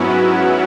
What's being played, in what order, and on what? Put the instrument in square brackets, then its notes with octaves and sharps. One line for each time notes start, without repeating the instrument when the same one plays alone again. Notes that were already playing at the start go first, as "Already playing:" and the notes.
Already playing: [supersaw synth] G#2 F#3 B3 C#4 E4 F#4